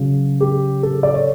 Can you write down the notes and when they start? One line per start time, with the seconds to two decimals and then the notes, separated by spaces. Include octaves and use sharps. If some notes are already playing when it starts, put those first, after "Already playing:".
Already playing: C#3 F#3
0.41 G4
0.83 A4
1.03 D5
1.14 C#5